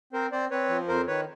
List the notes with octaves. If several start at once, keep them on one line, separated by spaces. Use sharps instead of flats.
C4 A#4 C5
C4 C5 D5
C4 B4 C#5
F3
F2 A#4 C5
D#3 B4 C#5